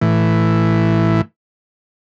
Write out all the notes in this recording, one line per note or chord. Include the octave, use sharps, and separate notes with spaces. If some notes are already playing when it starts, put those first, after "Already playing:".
A2 E3